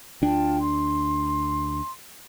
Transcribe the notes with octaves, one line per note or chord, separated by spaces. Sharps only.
D2 D4 F4 G5 A5
C6